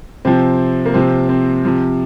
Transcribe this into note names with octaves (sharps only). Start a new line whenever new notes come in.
C3 F3 C4
A#3
C3 F3 C4
C4
C3 F3